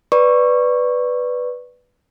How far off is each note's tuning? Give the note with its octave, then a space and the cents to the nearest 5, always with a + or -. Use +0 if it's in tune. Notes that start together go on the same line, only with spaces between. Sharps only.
B4 +0 D5 +0 C#6 -5